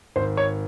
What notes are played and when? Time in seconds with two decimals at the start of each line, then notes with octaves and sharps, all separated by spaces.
0.16 G#1 C5
0.37 C#5